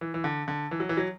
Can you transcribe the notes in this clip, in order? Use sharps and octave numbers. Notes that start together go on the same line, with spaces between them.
E3
E3
D3
D3
E3
F#3
E3
F#3